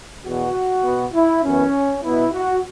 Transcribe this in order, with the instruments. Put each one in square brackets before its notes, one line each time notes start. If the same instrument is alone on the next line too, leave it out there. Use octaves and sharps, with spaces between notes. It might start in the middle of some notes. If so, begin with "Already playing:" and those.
[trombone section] E2 B2 B3 F#4
B2 B3
E4
F#2 E3 B3 C#4
B2 B3 E4
F#4